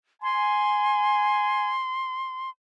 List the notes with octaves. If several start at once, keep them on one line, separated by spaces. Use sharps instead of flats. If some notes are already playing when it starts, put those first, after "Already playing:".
G#5 C6